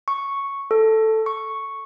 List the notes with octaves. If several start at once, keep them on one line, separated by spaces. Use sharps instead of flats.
C#6
A4
C#6